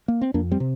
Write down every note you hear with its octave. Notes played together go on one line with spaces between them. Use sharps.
A#3
C4
F2 A#3 D4
G3 C4
C3